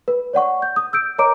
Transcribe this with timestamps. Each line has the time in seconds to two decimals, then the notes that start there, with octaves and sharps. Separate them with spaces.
0.08 B4
0.33 C#5 D5 F#5 C#6
0.62 G6
0.76 D#6
0.93 E6 G6 D7
1.18 A#4 C#5 D#5 A#5 D6 D7